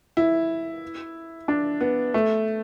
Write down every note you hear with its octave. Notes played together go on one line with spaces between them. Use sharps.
E4
D4
B3
A3